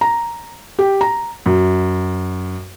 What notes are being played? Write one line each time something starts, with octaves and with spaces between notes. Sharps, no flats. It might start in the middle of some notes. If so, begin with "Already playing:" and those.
A#5
G4
A#5
F#2